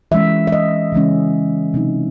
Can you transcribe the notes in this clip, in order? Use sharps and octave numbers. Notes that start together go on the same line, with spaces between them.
E3 G#3 C#4 E5
E5
D#5
C#3 E3 G#3 C#4
C3 F#3 C4 D#4